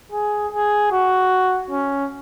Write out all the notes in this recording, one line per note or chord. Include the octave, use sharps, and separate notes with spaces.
G#4
G#4
F#4
C#4